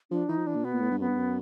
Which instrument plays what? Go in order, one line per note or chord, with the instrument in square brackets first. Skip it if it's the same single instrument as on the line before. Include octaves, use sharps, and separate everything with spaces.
[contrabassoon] F3 [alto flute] D4
[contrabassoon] E3 [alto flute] D#4
[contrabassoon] F3
[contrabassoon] E3 [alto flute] D4
[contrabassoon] A#2
[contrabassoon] B2 [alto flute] B3
[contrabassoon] A#2
A2
G2
[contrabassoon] F#2 [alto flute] B3
[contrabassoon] G2
F#2